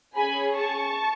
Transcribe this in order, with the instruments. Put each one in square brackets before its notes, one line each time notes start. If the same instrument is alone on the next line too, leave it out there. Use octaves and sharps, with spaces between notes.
[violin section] C#4 G#4 G#5 B5
A5 C#6